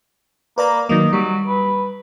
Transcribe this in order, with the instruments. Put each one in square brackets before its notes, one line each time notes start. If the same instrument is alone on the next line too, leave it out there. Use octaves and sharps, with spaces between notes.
[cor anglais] A#3 [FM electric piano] B4 D5 A#5
[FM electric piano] D#3 F#3 A#3 [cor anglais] D#5
[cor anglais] F#3 [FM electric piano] G3
[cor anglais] B4